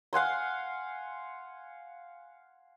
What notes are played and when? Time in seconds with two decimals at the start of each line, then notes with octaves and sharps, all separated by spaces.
0.13 F5 F#5 G#5 C6